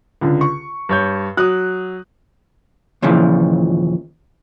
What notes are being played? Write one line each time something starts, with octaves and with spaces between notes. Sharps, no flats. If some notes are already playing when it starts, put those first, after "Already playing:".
C#2 D3
C#6
G2 C#5 G6
F#3 D#6 F#6
D#2 A#2 C#3 E3 F3